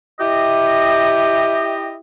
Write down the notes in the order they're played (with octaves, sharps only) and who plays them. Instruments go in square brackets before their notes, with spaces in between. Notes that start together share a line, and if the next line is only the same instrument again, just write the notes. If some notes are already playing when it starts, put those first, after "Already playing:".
[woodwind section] E4 G4 D#5